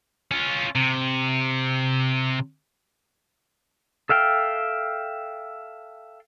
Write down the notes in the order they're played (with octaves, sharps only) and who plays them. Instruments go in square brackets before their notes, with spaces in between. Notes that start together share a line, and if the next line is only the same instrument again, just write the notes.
[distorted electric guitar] C#4 F4
C3
[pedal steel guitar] A4 E5 F5 G5